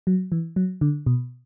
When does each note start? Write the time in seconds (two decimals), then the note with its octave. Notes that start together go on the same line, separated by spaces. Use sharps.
0.07 F#3
0.32 E3
0.56 F#3
0.81 D3
1.06 B2